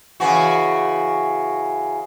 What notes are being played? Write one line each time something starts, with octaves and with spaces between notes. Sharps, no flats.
C#3 E3 F#4